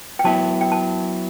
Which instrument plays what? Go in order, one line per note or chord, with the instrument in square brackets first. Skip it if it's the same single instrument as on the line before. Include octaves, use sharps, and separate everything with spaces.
[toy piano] G5
[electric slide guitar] F#3 B3 E4 [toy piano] A5
[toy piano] G5
A5